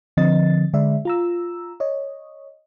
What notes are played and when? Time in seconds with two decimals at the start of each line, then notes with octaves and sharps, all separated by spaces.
0.17 D3 F3 C4 D#5 A6
0.73 D3 G#3 D5 E5
1.05 F4 A#5 E6
1.80 C#5 D#5